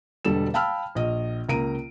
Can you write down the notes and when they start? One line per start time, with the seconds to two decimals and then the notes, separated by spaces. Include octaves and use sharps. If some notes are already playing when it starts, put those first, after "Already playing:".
0.25 E1 B2 D3 G3 A4 E7
0.54 F5 G5 A5 B5 E6 F6
0.95 A#1 D#5
1.49 C#2 A#3 A#5 D7 D#7